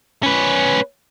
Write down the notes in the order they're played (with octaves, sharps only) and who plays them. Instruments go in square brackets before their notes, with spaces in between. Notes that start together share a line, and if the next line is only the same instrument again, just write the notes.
[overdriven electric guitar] C#4 B4